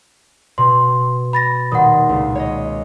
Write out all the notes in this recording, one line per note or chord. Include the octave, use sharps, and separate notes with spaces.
B2 C6
B5 A6 A#6
D#1 F#5 C6 D#6
C#2
C#5 D#5